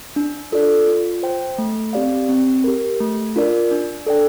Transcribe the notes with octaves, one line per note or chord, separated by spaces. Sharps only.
D4
F4 A4 D5
F4
C5 G5
A3
C4 G4 D5 F5
C4
G4 A#4
A3
D4 F4 A#4 D5
D4
A4 D5 G5